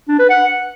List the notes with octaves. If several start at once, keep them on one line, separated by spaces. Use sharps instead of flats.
D4
B4
F#5